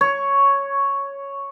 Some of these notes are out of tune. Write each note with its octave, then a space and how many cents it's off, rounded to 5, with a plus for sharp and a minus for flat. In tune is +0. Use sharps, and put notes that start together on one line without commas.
C#5 +0